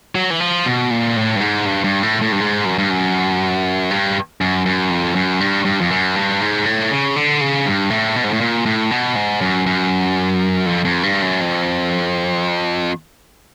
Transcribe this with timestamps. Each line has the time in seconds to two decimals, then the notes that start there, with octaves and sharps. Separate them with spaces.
0.15 F#3
0.30 E3
0.40 F3
0.66 B2
0.91 A#2
1.16 A2
1.36 G2
1.41 G#2
1.66 G2
1.84 G2
2.03 A2
2.21 A2
2.32 G2
2.40 G#2
2.65 F#2
2.78 G2
2.90 F#2
3.90 G2
4.41 F#2
4.66 F#2
4.90 F2
5.15 F#2
5.40 G2
5.65 G2
5.81 F2
5.91 F#2
6.16 G2
6.41 G#2
6.66 A2
6.91 C#3
7.16 D3
7.41 C#3
7.66 G2
7.90 A2
8.16 B2
8.24 G#2
8.33 A2
8.41 A#2
8.66 A2
8.91 B2
9.16 G#2
9.41 F#2
9.66 F#2
10.66 F2
10.85 F2
11.03 G2
11.22 F#2
11.41 F2